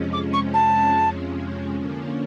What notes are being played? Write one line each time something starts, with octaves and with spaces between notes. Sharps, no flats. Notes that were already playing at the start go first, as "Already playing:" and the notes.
Already playing: F2 C3 F3 G#3 C#4
D6
C#6
A5
D3 F3 A#3 C#4